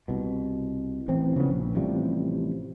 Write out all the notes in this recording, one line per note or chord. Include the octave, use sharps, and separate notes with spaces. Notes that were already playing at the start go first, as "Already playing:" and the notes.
C2 B2
A1 E3 C4
C#3 F3 A#3 B3
A#1
A1 C3 F3 G3